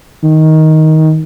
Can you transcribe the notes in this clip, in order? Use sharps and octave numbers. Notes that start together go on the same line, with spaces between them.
D#3